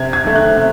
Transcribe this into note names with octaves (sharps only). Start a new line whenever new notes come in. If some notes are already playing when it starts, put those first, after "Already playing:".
Already playing: C3 G#6
G#6
D#3 A3
F#6
C3